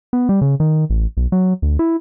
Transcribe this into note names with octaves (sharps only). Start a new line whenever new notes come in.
B3
G3
C#3
D#3
A1
B1
F#3
D2
E4